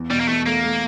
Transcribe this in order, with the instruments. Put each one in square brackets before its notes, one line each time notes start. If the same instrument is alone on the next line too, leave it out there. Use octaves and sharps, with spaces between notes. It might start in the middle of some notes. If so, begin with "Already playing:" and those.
Already playing: [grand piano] E2
[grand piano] B2 [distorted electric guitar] G3
[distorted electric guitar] A#3
[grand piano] E2 [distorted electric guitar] A3
[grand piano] A3 [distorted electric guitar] A#3
[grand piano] A3